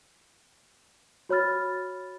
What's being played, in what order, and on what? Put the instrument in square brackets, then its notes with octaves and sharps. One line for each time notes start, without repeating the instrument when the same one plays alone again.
[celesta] F#4 C#5 B5 F6 A6